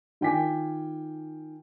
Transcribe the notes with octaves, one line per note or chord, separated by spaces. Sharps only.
D#3 F4 G5 G#5 D6 B6